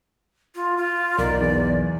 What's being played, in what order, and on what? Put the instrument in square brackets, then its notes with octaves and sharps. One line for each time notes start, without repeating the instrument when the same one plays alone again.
[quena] F4
F4
[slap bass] B1 [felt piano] D#4 A#4 [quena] D5
[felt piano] E2